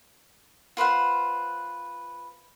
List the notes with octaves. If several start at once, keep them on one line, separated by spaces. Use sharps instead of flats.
F4 B4 C5 F#5